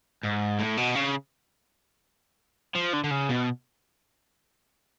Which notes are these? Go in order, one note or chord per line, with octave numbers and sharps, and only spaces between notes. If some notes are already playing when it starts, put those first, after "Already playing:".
G#2
A2
B2
C#3
F3
D3
D3
C#3
B2